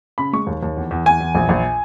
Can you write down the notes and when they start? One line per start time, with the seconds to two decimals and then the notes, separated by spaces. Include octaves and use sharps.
0.18 C#3 B5
0.33 G#3 C#6
0.47 D#2
0.63 D#2
0.77 E2
0.91 E2
1.06 E2 G#5
1.20 E2
1.35 A#1
1.49 A#1